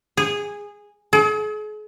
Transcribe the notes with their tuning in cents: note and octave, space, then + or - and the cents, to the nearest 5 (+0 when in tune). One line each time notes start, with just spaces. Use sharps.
G#4 -15
G#4 +40